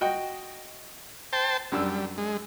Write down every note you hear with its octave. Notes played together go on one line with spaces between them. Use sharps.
F#4 D#5 G5
C5 G5 A5
F#2 G3 D4 E6
G#3